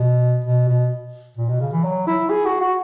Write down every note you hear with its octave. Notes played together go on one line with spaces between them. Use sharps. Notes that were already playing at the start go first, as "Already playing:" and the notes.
Already playing: B2
B2
B2
A#2
B2
C#3
E3
F#3
E4
G#4
F#4
F#4